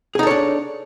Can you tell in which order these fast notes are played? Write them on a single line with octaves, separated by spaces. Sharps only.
G#4 D#4 A4 C#5 D4